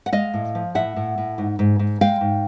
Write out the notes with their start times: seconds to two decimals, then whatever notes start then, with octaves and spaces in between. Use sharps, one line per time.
0.06 F#5
0.12 G#3 D#5 F5
0.34 A2
0.55 F3
0.75 A2 E5 F#5
0.96 A2
1.18 A2
1.38 G#2
1.59 G#2
1.79 G#2
2.01 G#3 F5 G5
2.21 G#2